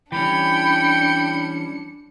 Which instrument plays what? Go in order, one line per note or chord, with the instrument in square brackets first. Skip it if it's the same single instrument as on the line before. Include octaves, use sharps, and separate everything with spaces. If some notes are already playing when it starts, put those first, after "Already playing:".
[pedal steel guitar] E3 G3 C#4 [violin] D4 C#7 [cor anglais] G5 [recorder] B5